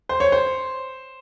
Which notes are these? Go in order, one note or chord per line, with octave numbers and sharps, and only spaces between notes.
C5
C#5
C5